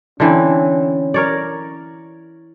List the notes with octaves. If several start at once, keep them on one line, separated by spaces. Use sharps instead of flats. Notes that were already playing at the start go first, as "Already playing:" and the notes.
D3 E3 C4 C#4
A#4 C#5 D5